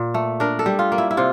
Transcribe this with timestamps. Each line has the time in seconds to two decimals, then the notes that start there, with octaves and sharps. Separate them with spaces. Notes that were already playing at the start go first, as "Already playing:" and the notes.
Already playing: A#2
0.14 A3
0.40 D4 A#4
0.59 A4
0.66 G3
0.79 F4
0.92 A#3
0.98 E4
1.11 E4
1.17 C3 F4